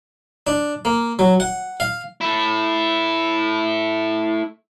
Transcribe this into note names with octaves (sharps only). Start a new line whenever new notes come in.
D4
A#3
F#3
F#5
F5
A3 E4